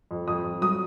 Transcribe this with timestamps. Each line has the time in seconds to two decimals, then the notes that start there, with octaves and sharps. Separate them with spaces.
0.11 F2
0.28 F2 D#6
0.44 F2
0.61 F#3 D#6